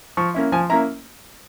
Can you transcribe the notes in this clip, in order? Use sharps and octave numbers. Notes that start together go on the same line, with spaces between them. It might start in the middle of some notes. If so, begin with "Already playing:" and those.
F3 C#6
A#3 C#4 E4
F3 G#5
A#3 C#4 E4 A#5